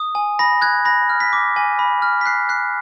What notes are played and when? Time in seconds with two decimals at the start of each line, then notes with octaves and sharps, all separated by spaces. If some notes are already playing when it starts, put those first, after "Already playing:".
Already playing: D#6
0.15 G#5
0.39 B5 A#6
0.62 F#6 G#6
0.85 B5 A#6
1.10 F6
1.20 B6
1.33 D6
1.56 G#5
1.79 B5
2.02 F6
2.21 B6
2.26 F#6 C7
2.49 F#6 C7